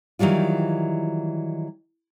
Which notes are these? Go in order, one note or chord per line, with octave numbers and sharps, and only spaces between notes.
D#3 E3 F#3 G3 F4